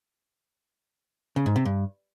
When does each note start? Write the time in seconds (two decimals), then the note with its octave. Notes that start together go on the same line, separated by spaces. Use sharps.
1.36 C#3
1.46 G#2
1.56 C3
1.65 G2